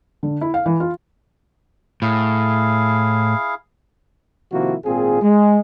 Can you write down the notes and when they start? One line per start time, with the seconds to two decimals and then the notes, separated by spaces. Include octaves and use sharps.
0.23 D3
0.41 E4
0.54 F5
0.66 E3
0.80 F4
2.02 A2 E4 G#4 F5
4.52 C3 D#3 F3 A#3 E4 F#4
4.85 G#1 A#2 C4 F4 G#4
5.22 G#3